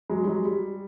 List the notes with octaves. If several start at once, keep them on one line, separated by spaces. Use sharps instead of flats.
F#3 G#3
G3
F#3 G#3
G3